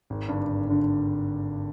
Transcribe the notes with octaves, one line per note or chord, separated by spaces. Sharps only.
G#1
G2 D3
G#1
G2 D3